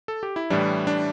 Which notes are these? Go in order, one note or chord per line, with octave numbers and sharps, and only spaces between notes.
A4
G4
E4
A2 E3 G3 D4
D4